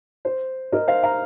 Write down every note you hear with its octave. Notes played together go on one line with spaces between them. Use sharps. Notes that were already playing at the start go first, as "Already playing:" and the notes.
C5
A#4 D#5
C5 F5
F5 A#5